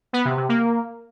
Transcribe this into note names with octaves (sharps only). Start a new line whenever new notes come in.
B3
C3
C3
A#3